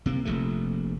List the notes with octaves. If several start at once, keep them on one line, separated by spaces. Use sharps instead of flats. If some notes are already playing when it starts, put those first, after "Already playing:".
C3 A#3
F1 A#1 C3 A3